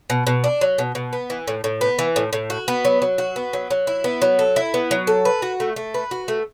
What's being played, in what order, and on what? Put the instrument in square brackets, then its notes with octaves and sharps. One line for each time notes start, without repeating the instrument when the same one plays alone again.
[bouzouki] B2
B2
D4
F#3
B2
B2
B3
E3
A2
A2
B3
E3
A2
A2
F#4
B3
F#3
F#3
F#4
B3
F#3
F#3
E4
B3
F#3
A4
E4
B3
F#3
A4
B4
F#4
A3
A3
B4
F#4
A3